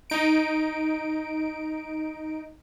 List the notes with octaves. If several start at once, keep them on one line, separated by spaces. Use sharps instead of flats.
D#4 D7